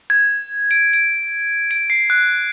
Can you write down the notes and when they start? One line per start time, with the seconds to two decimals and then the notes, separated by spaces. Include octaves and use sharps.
0.10 G#6
0.71 D7
0.93 D7
1.71 D7
1.90 C7
2.10 F#6